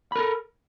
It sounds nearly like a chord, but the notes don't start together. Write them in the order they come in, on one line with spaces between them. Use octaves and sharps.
B5 A#4 A4